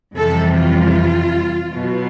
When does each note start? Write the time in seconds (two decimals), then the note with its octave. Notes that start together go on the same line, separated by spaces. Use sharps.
0.15 F2 C3 E3 G3 A4
0.55 F4
1.72 B2 F#3 B3